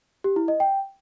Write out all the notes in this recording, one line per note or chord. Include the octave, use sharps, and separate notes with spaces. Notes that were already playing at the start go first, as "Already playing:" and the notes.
G4
E4
D#5
G5